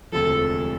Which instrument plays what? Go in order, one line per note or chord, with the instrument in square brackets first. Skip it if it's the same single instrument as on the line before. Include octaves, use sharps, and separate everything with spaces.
[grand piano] E1 D2 C3 F3 [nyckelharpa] A4